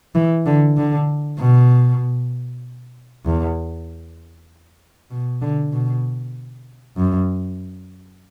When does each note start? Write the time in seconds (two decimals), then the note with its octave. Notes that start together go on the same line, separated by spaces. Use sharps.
0.15 E3
0.46 D3
0.77 D3
1.39 B2
3.25 E2
5.11 B2
5.41 D3
5.73 B2
6.97 F#2